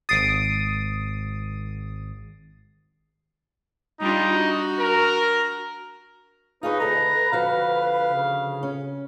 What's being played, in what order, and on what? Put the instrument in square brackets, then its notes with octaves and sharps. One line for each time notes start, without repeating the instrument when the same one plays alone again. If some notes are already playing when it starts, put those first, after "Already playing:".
[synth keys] G#1 D#6 [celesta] A6 C7 D7
[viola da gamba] G3 D4 F4 [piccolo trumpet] D#4
[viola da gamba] F#4
[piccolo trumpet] A#4
[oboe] D#4 [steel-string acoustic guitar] F4 G#4 C#5 [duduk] B4
[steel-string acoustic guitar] D2 A4 D#5 [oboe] A#5
[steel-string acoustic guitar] D3 F3 F#4 [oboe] F5
[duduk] C#3
[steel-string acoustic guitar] C#4